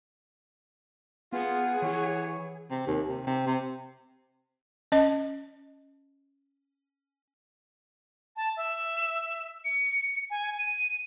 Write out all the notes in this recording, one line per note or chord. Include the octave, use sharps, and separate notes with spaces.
B3 F4 G#4 F#5
E3 C#5
C3
D#2
C3
C3
C3
C#4 D#5
A5
E5
C#7
G#5
D#7